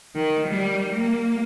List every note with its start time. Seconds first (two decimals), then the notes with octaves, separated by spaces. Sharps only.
0.15 D#3
0.47 G3
0.93 A#3